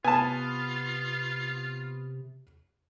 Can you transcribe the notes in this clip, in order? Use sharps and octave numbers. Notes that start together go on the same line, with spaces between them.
C3 B3 F4 G#5 A5